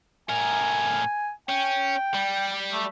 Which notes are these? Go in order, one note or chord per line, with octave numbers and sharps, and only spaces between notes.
A2 A#4 G#5
C#4 G5
G3
A3